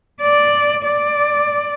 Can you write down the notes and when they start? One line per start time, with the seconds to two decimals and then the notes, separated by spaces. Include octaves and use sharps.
0.22 D5
0.84 D5